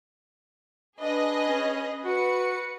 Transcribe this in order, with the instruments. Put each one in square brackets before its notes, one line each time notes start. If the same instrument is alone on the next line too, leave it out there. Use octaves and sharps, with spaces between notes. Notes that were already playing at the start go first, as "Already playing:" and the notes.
[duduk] D4 [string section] G#4 B4 D#5
[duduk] C#4
[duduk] F#4 [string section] B4 C#7